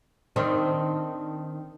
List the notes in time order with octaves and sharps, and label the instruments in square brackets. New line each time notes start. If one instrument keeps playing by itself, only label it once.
[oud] D#3 C4 D4